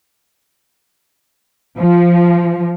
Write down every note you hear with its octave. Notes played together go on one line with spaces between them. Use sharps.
F3